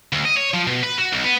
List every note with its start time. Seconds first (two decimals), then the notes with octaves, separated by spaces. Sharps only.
0.12 D2
0.25 D#5
0.37 C#5
0.54 F3
0.67 B2
0.83 B4
0.98 F#4
1.12 B1
1.24 B3